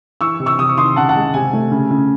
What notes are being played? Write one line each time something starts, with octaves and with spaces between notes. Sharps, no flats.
E3 C#6 E6
C3
C#6 E6
C3 D#6
C#6
D#3 C6 D#6
C#3 F#5 A5
F#5 A5
G#3
C3 G#5
A3
C#3
C#3